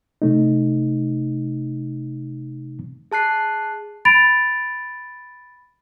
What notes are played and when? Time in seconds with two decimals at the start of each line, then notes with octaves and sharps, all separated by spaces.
0.22 C3 A3 D#4
3.12 G#4 A5 F#6 C7
4.05 B5 A6 D7 F7